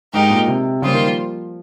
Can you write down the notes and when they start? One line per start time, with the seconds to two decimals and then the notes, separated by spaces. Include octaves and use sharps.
0.13 G#2 G#3 D#4 G4 A#4
0.30 A#2
0.48 C3
0.82 C#3 G3 A#3 F4 C5
0.94 D#3
1.06 F3